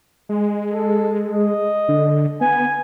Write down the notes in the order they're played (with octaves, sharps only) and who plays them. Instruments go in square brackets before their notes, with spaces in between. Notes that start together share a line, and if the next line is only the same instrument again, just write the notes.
[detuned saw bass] G#3
[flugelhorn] A4
D#5
[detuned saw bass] D3
[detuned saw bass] B3 [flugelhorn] G#5